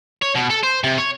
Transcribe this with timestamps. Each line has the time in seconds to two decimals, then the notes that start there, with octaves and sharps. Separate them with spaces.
0.22 C#5
0.35 B2
0.50 A4
0.63 C5
0.84 C3
0.98 C#5